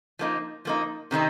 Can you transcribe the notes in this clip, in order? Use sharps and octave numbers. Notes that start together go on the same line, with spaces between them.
F3 A#3 D#4
F3 A#3 D#4
C3 D#3 C4 D#4